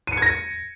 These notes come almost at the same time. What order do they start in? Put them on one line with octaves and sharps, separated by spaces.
D#7 C#7 G#6 A#6